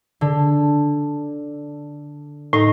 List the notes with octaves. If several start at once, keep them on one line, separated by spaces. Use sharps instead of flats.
D3
A2 D#4